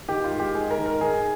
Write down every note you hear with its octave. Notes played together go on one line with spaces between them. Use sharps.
D#3 G4
F4
G#2
G4
G#2 G#4
A#4
D#3
A#4
D#3 G#4